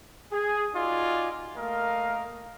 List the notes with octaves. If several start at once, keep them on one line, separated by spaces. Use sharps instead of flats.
G#4
D#4 F4 F#4 D5 D#5 G#5
A3 A#3 A#4 D#5 F5